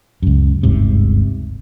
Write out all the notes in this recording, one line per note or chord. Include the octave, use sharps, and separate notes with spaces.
C#2 F#2
G1 D2 G#2 C3